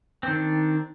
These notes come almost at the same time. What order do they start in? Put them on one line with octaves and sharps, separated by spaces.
C4 D#3 D4